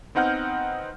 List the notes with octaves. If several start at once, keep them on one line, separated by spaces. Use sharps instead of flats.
B3 C4 D#4 F#5 F6 G6